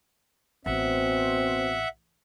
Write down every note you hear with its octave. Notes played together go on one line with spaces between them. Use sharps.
A1 B2 C4 E5 F#5